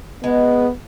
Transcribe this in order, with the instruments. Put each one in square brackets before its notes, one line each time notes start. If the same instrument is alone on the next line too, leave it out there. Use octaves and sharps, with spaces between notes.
[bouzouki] G#3 [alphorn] B3